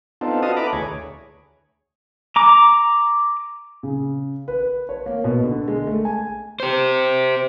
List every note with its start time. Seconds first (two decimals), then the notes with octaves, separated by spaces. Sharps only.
0.21 B3 C4 D4 D#4 F4 A4
0.43 F#4 B4 D#5 F5 A5 D#6
0.57 E4 A4 B4 A#5 B5 D6
0.73 D2 G#4 C#5
2.36 A#5 D6
3.83 C#3
4.48 B4
4.89 C#5
5.06 A#3
5.24 B2
5.44 D3
5.68 G#3
5.87 A3
6.05 G#5
6.60 G4 C5